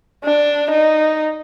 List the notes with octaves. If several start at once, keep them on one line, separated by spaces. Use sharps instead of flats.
D4
D#4